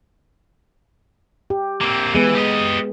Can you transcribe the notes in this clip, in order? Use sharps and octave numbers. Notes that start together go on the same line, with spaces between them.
G4
A#3 C4
E3 G#3 B3
G4 D#5